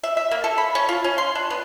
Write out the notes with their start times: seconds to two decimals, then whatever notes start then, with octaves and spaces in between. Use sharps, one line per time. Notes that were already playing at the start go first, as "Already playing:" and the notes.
0.03 E5
0.17 E5
0.31 A#3
0.44 A4
0.58 B5
0.75 C#4
0.89 F4
1.04 C#4
1.18 C6
1.35 D4
1.50 B3